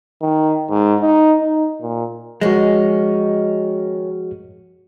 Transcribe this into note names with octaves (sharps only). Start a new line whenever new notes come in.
D#3
G#2
D#4
D#4
A#2
D#3 F3 G#3 C#4 F#4